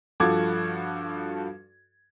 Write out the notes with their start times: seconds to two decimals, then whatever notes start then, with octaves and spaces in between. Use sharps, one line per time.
0.20 G2 F3 F#4 A4 D6 G#6